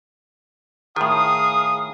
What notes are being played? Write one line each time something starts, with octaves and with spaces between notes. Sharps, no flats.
A2 D#3 G#4 F5 D#6